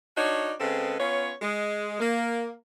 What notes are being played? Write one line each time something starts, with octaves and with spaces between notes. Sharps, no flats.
D4 D#4 F#4 C#5 D5
C#3 G#3 C4 A4 B4
B3 C#4 F4 C#5
G#3
A#3